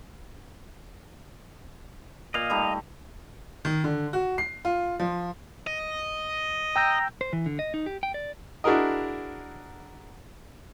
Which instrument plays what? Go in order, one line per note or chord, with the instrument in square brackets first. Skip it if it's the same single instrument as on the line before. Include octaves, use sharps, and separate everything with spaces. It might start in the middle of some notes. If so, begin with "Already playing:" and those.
[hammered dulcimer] A#2 [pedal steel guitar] D#5 F5
[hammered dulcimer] G3 A3 D#4
[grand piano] D#3
D3
F#4
C7
F4
F3
[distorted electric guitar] D#5
[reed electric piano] G5 E6 G6 [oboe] A#5
[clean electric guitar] C5
E3
D3
D#5
D#4
G4
G5
D5
[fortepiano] D4 E4 F#4 G#4 A#4 D#5